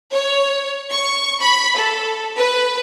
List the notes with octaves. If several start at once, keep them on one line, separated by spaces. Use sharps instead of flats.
C#5
C#6
B5
A4
B4